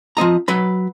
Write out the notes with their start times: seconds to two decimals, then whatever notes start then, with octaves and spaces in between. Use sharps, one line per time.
0.17 F3 C4 D#5 A#5
0.48 F#3 B4 B5